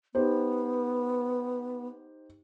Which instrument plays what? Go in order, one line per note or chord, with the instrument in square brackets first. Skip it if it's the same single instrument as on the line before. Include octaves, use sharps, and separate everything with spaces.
[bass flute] B3 [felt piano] D#4 G4 C5